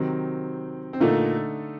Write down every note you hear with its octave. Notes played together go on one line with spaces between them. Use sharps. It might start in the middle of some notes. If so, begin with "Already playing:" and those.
Already playing: C3 D#3 F#3 C4
C4
A#2 D3 A3 A#3 D#4 A4